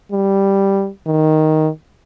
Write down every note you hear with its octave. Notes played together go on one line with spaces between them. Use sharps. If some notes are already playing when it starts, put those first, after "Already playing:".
G3
D#3